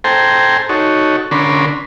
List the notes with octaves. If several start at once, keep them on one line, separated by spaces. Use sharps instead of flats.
A4 C5 G5 G#5 A#5 C6
D#4 F#4 A4 C#5
D3 C#4 D4 A#4 B5 C6